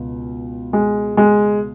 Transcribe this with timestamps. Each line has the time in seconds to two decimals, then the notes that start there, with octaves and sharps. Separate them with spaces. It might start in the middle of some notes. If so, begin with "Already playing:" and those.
Already playing: C#2 B2
0.73 G#3
1.17 G#3